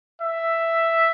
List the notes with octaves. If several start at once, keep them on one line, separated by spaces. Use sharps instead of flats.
E5